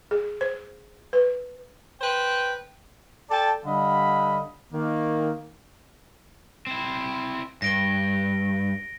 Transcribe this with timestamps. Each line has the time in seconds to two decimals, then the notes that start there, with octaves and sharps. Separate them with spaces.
0.11 G#4
0.41 C5
1.13 B4
2.00 B4 C5 G5
3.30 A4 D5 G5 A5
3.65 D3 G3 D#5 F5 F#5 B5
4.73 D#3 A#3
6.67 C4 E4
7.62 G2 A#6 D7 G7